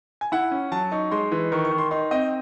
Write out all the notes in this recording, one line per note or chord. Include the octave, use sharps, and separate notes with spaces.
G#5
E4 F#5
C#4
F#3 A5
D#4 C#6
G#3 C6
E3
D#3 C#6
C#6
D#3
C6
D#4 C6
C4 D#5